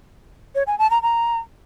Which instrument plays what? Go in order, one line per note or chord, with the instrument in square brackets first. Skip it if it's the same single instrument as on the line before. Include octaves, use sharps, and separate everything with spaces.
[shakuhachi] C#5
G#5
A5
A#5
A#5